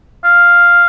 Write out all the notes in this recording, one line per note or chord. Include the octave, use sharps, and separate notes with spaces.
F5